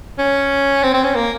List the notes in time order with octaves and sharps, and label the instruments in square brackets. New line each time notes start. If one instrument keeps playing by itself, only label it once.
[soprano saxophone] C#4
C4
C4
C#4
A#3